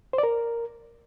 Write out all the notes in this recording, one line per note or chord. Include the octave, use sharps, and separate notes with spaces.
C5
D5
A#4